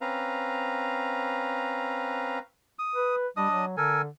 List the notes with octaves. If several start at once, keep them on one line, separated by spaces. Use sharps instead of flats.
C4 C#4 B4 F5 A#5
D#6
B4
G3 D4 D#5 D#6
F#3
D3 A4 A#4 G#5